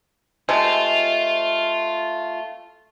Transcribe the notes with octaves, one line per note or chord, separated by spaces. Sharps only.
C3 G#3 A3 F4